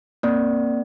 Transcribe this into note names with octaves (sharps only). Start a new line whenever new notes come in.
A#3 C4 D5